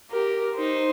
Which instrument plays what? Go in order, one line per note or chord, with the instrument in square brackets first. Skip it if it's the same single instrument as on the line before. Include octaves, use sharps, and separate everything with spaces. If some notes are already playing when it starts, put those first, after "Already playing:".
[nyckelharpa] G4 [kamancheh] A#4
[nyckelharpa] D#4 [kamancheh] C5